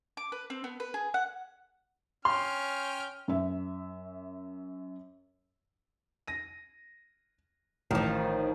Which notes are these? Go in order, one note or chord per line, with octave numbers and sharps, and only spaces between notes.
D6
B4
C4
B3
B4
G#4
F#5
C#4 G5 C6 F6
F#2 E5
A#6 D#7
A1 D#3 F3